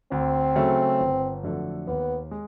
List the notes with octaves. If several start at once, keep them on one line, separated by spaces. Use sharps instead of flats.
D2 C4
C#3 F#3 A3 C#4
G1
F2 D3 F#3 A3
D#2 B3
G#3